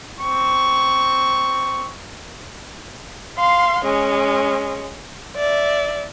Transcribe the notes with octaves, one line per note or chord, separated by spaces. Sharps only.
C4 C#6
F5 C6
G#3 C#4
D5 E5